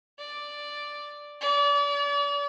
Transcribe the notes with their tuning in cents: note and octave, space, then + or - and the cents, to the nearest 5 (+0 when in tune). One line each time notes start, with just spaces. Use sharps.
D5 +0
D5 -40